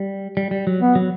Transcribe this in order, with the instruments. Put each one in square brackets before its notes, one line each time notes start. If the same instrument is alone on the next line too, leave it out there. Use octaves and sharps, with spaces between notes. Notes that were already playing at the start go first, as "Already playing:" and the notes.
Already playing: [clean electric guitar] G3
G3
G3
F#3
[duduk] B3
[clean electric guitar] F#3